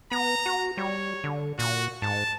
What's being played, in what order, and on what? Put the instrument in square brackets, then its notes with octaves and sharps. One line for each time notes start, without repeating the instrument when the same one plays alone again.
[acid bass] B3 [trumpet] A#5
[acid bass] F#4
[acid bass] G3 [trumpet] C#5
[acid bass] D3
[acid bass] A#2 [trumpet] F#4
[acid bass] G#2 [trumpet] A5